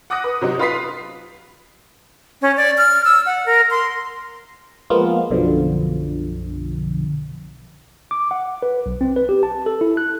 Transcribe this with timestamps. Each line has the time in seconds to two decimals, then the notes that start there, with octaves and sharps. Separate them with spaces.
0.10 F#5 D6 D#6 F#6 A#6
0.24 B4
0.41 C3 F#3 D#4
0.59 F4 B4 B5 D#6 B6 C7
2.42 C#4
2.57 D5
2.78 F6
3.05 E6
3.26 F#5
3.46 A#4
3.71 C6
4.90 F3 G#3 A#3 B3 F4
5.30 B1 F#2 B2 D3 F3
8.11 D6
8.31 F#5
8.62 B4
8.86 B1
9.01 C4
9.16 B4
9.29 G4
9.43 A5
9.66 A4
9.81 E4
9.97 F#6